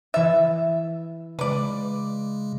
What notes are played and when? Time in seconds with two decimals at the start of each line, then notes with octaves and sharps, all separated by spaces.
0.14 E3 E5 A6
1.39 C#3 G#3 B4 D5